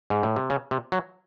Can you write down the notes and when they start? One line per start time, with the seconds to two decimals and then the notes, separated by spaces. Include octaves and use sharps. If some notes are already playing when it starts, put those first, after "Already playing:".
0.10 G#2
0.23 A2
0.36 C3
0.50 C#3
0.71 C3
0.92 F#3